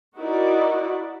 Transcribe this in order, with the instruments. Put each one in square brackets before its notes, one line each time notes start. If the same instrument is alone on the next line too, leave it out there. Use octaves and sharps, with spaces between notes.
[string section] D#4 E4 F#4 A#4 D5